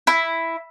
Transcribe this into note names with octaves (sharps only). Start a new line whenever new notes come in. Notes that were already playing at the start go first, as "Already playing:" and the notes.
E4